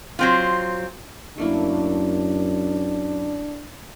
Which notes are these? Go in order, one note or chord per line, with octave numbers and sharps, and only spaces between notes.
F#3 C4 F4
F#2 A3 A#3 D4 E4